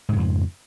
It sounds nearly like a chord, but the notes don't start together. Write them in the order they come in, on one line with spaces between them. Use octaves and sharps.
G#2 C#3 F2 F3